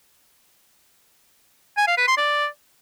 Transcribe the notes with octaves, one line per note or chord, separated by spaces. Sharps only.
G#5
F5
B4
C6
D5